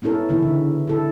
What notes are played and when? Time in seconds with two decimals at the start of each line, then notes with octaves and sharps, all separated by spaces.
0.02 B3 C#4 E4 A4 A#4
0.29 C#3 E3 B3 D#4 E4
0.42 D3
0.87 E4 A4